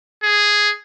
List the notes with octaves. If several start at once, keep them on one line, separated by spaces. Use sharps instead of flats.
G#4